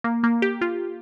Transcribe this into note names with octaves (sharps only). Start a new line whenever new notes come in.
A#3
A#3
G4
F4